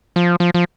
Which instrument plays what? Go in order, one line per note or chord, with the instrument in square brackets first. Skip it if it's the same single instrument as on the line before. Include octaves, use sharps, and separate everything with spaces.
[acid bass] F3
F3
F3